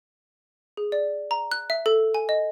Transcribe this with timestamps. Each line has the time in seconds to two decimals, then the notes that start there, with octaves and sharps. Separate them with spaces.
0.77 G#4
0.92 D5
1.31 A#5
1.52 F#6
1.70 E5
1.86 A4
2.14 G#5
2.29 D#5